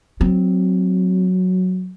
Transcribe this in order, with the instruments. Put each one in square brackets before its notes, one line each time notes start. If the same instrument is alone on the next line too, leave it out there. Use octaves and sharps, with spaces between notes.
[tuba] F#3 [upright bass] C4